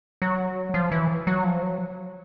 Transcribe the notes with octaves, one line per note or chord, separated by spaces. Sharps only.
F#3
F3
E3
F#3
F3
F#3